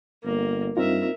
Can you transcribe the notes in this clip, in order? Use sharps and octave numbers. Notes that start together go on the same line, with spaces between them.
G1 A#3
G2 C4 D#4 F4 A#4 E5